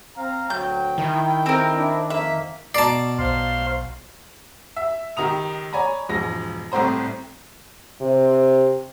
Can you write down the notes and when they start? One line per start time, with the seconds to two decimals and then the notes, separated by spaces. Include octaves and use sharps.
0.17 C4 F5 A#5
0.50 D2 F#3 G5 G6
0.98 D#3 E4
1.46 C4 A#4
1.77 D4 E4
2.10 F2 A#3 E5
2.75 B2 D5 A5 A#5 C7
3.19 B1 C5 F5 C6
4.76 E5
5.17 C#2 D#3 G4 A#5 D#6 F7
5.73 C#5 D5 G#5 A#5 B5
6.09 E1 G#2 F3 A#6
6.72 C2 A2 C4 C5 A#5
8.01 C3